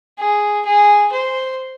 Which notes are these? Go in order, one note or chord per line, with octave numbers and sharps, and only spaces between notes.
G#4
G#4
C5